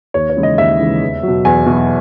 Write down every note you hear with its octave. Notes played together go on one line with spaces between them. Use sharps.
D#2 C#5
C#5
C#3 E3 G#3
D#5
D#2 E5
C#3 E3 G#3
E2
B2 F#3
E2 G#5
B2 F#3